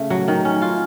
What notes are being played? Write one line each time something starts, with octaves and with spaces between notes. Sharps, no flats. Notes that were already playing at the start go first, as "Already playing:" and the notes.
Already playing: C#3 A3
F#3
D#3
C#4
F4